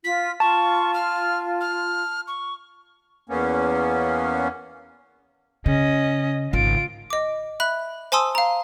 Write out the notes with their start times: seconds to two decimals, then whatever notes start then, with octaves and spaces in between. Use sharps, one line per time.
0.04 F4 B6
0.40 F4 A5 C#6
0.94 F6
1.61 F6
2.28 C#6
3.29 E2 A#3 B3 C#4
5.66 C#3 C#4 D#5
6.53 G#1 C#3 F4 D7
7.10 D#5 D6
7.60 E5 B5 F#6
8.12 C5 G#5 A5 C6 D#6 E6
8.35 F5 A#5